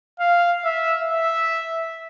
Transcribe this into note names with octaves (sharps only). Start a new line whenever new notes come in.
F5
E5
E5